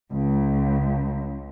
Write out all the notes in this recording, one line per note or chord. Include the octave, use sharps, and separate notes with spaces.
C#2